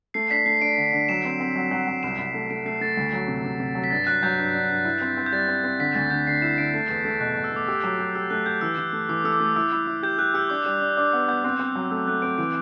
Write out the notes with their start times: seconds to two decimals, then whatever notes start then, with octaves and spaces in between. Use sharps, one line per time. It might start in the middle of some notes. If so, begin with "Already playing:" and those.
0.14 A3 C7
0.31 D4 B6
0.46 A3 C7
0.61 D4 D7
0.78 D3
0.93 D3
1.09 F#3 E7
1.25 C4
1.40 C4
1.56 F#3
1.71 F#3
1.87 F#3
2.03 C2 E7
2.18 C2
2.34 A3
2.50 A3 D7
2.66 A3 C7
2.81 A3 A6
2.97 D2
3.13 F#3
3.28 C3
3.44 C3
3.60 C3
3.75 F#3
3.84 B6
3.91 G2 A6
4.06 F#3 F#6
4.23 F#3 G6
4.39 G2
4.55 D4
4.69 G2
4.85 E4
5.01 C4
5.17 C4
5.26 G6
5.33 G3 A6
5.48 C4
5.64 C4
5.80 D3 B6
5.95 D2 A6
6.10 D3 G6
6.27 D3 C7
6.42 E4 E7
6.58 D3 D7
6.74 A3 C7
6.89 E2
7.05 A3
7.20 B2 F#6
7.32 F#6
7.37 B2
7.44 E6
7.52 A3 D6
7.68 G4 E6
7.84 F#3
7.99 G4
8.15 G4 E6
8.30 A3 F#6
8.46 G4 G6
8.61 E3 E6
8.78 E3
8.93 A3
9.09 E3 D6
9.24 A3 E6
9.33 D6
9.40 A3
9.56 E4 E6
9.72 E4
9.87 E4
10.03 G4 G6
10.18 G4 F#6
10.34 G4 E6
10.50 D4 D6
10.66 G3
10.82 D4
10.97 D4 D6
11.12 B3 E6
11.28 B3 G6
11.44 C4 F#6
11.59 C4
11.68 E6
11.75 F#3
11.91 A3 E6
12.08 A3 F#6
12.22 C4 D7
12.38 E3 D7